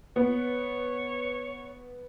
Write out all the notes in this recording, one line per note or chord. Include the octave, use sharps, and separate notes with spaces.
B3 C#5